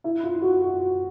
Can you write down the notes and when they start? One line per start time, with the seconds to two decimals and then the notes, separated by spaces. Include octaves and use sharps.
0.04 E4
0.23 F4
0.42 F#4
0.61 F#4